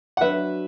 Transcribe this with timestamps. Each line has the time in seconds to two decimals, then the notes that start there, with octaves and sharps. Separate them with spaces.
0.17 F#5
0.21 F#3 D4 F#4 B4 E5